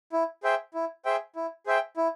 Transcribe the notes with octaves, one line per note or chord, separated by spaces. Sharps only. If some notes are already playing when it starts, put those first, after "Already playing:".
E4
G#4 C5 E5 G5
E4
G#4 C5 E5 G5
E4
G#4 C5 E5 G5
E4